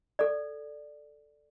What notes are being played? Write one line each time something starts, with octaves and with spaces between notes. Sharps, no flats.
A4 D5